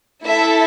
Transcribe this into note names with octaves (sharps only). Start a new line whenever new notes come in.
A3 E4 A4 E5